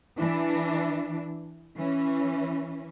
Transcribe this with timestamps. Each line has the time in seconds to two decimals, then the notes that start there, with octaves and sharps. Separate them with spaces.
0.18 E3 D4
1.78 E3 C#4